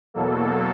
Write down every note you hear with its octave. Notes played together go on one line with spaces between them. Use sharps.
E2 B2 F#3 A#3 A4